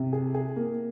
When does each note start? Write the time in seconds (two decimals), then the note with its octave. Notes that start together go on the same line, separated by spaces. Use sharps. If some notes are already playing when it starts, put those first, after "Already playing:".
Already playing: C3
0.13 G#4
0.35 G#4
0.56 A#3